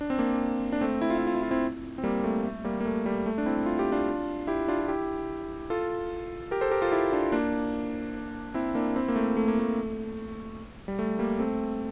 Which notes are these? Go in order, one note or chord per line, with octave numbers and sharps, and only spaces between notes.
D4
C4
A#3 D4
D4
A3 C4
E4
F4
E4
F4
E4
F4
C4 E4
C4
G3 A#3
A3
A3
G3 A#3
A#3
A3
G3
A3
D4
C4 E4
F4
G4
D4 F4
E4 G4
D4 F4
F4
E4 G4
F4 A4
G4 A#4
A4 C5
G4 A#4
F4 A4
E4 G4
D4 F4
A#3 D4
C4 E4
A#3 D4
C4 E4
A#3
A3
A3
A#3
A3
G3
A3
G3 A#3
A3 C4